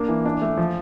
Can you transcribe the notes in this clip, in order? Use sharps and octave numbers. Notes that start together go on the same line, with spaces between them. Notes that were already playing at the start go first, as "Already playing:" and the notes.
Already playing: A#3 D4
E3
D4
A3
F3